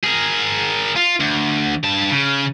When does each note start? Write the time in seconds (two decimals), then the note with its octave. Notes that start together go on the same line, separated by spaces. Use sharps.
0.04 G#4 A#4
0.96 F4
1.20 D2
1.84 G2 A5
2.11 C#3